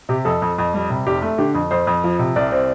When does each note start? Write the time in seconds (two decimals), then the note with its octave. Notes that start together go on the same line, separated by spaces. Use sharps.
0.09 C3 G4
0.25 F2 A4
0.42 F2
0.58 F2
0.74 G3
0.90 C3
1.07 F1 G4
1.22 A3
1.38 D3 G4
1.54 F2
1.71 F2 C5
1.87 F2
2.04 F3
2.19 C3
2.36 C2 D5
2.52 C4